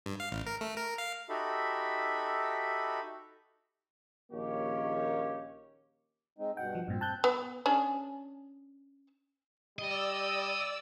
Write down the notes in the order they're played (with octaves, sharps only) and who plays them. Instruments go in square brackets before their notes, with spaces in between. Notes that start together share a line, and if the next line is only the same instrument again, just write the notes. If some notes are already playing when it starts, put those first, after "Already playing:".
[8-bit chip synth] G2
F5
A1
A#4
A3
A#4
F5
[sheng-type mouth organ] D#4 F#4 G4 A4 E5 B5
[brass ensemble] A#1 D#3 A#3 C#4 G4 C#5
[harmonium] G#3 C4 D#4
[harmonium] G2 B2 F#5 [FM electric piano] G5
[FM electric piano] F3
[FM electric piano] G2 A#2 [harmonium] C4
[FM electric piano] A5 F#6 G6
[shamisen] B3
C#4 D4 G#4
[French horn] G3 [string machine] D5 E6 [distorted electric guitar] D#5